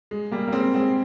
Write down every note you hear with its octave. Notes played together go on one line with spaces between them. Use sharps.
G#3
G3 A#3
A#3
G#3 C4
G#3 C4